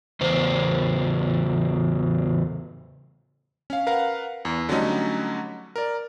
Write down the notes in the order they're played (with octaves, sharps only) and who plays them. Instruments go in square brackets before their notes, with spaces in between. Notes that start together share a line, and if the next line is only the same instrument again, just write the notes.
[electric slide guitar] E2 C#3 C5
[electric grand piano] C#4 F5
A#4 B4 F5 F#5
E2
D3 F#3 G3 A3 C#4 D#4
A#4 D5